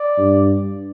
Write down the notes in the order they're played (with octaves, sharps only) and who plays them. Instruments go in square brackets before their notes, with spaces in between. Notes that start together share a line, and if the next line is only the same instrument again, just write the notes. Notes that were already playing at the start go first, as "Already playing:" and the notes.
Already playing: [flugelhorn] D5
[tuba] G2